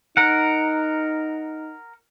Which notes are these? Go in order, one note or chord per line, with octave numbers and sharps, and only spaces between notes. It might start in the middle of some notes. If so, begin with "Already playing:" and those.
D#4 A#4 F#5